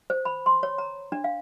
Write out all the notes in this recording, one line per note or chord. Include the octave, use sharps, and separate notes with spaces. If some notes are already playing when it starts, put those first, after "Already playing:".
C5
B5
C6
C#5
A#5
D4
F5